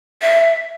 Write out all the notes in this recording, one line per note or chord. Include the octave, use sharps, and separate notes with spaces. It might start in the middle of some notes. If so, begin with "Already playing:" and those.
E5